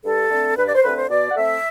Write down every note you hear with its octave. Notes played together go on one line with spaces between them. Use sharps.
G2 A4
D3 A3 C4
G2 B4
D5
C5
D3 A3 C4 B4
C5
B2 D5
F#5
A3 C4 E5